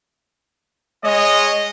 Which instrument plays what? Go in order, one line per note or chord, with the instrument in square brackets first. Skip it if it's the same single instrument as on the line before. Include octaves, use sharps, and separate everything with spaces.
[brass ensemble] G#3 C#5 D#5